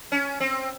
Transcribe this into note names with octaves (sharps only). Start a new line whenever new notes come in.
C#4
C4